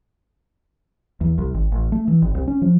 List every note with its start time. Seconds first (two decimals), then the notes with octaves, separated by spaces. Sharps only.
1.21 E2
1.38 C2
1.54 G#1
1.72 A1
1.92 A3
2.08 E3
2.22 G#1
2.35 C2
2.47 C#4
2.62 F3